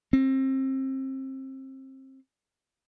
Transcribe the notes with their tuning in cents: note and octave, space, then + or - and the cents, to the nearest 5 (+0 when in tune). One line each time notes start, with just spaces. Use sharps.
C4 +30